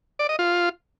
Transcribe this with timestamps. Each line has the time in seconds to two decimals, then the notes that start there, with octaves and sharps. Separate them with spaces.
0.19 D5
0.29 D#5
0.39 F4